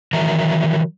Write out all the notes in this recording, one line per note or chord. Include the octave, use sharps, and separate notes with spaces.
D#3 E3 F#3 A#4 E5 A#5